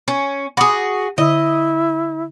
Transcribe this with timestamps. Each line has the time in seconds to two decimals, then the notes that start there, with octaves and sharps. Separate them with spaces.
0.08 C#4
0.57 F#4 G#4 B5 D6 D#6
1.18 D3 E4 D#5